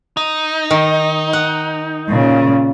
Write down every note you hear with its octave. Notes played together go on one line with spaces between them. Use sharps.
D#4
D#3
F#5
A#2 C#3